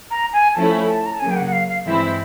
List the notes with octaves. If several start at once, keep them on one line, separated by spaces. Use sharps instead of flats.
A#5
G#5
F3 A3 C#4 E4 A5
A5
A#5
A5
C#3 F#3 A#3 G#5
G5
F#5
F#5
F5
F5
G2 E3 G#3 C4 E4 E5